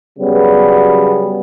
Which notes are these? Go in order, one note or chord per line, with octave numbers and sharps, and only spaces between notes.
C#3 F#3 G3 B3